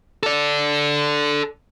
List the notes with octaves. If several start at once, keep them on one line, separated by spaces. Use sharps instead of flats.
A4 D5